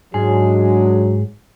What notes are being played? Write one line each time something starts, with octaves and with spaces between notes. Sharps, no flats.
G#2 F#3 G#3 D4 G#4